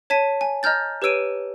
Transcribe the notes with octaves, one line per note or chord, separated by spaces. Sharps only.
C#5 A5 B6 D#7
G#5
D#5 A#5 F6 G6 A6
G4 B4 C#5 E6 D7 D#7